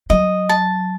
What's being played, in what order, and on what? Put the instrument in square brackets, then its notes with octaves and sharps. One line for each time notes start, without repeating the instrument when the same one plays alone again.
[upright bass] F#3 [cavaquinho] D#5
[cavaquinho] A5